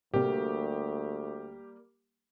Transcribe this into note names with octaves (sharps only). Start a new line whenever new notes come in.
D2 A2 C3 G3 A#3 G4